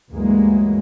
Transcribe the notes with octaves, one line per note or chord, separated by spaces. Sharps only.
D2 G2 E3 F#3 G#3 A#3